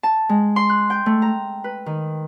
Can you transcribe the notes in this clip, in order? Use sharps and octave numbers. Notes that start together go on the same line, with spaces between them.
A5
G#3
C6
F#6
G5
A3
A#5
B4
D#3